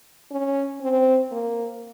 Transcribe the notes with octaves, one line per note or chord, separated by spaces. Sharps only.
C#4
C4
A#3